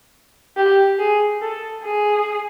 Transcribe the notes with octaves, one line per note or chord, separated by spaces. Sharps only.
G4
G#4
A4
G#4